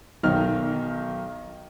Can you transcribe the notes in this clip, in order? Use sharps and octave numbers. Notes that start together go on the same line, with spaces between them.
B1 D#3 F6